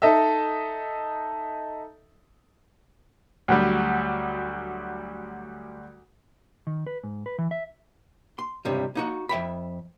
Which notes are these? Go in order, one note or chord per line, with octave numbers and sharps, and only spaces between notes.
D#4 A4 D#5 E5
D2 F#3 G3
D#3
B4
G#2
B4
E3
E5
C6
C#2 G2 C3 G3
A#3 D#4 F#4
F2 E5 G5 B5